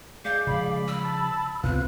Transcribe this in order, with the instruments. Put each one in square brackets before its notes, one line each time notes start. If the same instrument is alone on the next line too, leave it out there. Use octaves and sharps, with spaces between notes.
[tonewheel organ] G#3 D5 [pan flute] F5 [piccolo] G6
[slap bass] C#3 F3 [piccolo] B5
[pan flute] E6
[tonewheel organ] A5
[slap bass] C#2 [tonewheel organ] C3 B3 F4 [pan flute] F#6